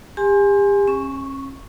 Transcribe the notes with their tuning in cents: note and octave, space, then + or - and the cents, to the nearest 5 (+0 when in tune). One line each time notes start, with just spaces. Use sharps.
G4 +35 G#5 +0 C6 +20
C#4 -40 C#6 +0